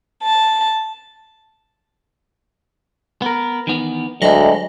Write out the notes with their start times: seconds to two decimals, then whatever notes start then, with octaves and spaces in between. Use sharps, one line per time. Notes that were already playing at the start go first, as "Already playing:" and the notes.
0.23 A5
3.22 B3 A#4
3.67 D#3 E3 B3
4.22 D2 F#3 G#3 D#5